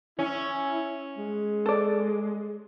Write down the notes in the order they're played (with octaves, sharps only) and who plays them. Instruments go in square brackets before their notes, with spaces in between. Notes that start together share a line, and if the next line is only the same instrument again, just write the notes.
[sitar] C#4 [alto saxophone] E4
[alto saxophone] G#3
[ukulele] A4 D5